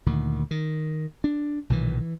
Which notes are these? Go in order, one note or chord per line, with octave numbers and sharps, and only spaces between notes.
D2 A#2 D#3
D#3
D4
B1 A#2 D#3 E3
E3